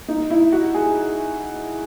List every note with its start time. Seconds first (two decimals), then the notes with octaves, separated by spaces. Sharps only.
0.08 D#4
0.30 E4
0.52 F#4
0.74 G#4